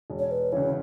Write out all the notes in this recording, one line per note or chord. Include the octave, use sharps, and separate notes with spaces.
E1
C#5
B4
D2 C#3 E3 C#5